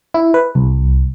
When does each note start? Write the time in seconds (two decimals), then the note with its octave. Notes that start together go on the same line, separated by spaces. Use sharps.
0.14 E4
0.34 B4
0.55 C2